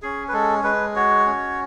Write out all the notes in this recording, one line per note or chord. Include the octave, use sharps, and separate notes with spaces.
C#4 G#4
B4
G#3 A4
G#3 B4
F#4 C#5
C#4